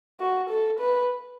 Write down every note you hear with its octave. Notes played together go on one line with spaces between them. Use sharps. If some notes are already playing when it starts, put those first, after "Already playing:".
F#4
A4
B4